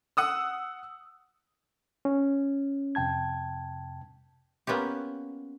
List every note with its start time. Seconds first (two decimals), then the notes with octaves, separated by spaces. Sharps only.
0.17 F#5 D#6 E6
2.05 C#4
2.95 F2 C3 G5 A5 G#6
4.67 A#3 B3 C#4 F4 G4